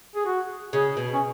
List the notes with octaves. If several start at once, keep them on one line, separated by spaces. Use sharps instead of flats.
G#4
F#4
C#3 G#4
B2
C#4